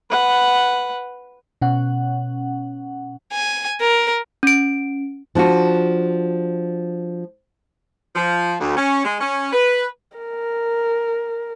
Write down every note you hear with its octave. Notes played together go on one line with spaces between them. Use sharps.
B4 F#5
B2 C#4 F#5
G#5
A#4
C#4 D7
F3 D4 F4 F#4
F3
D2
C#4
G#3
C#4
B4
A#4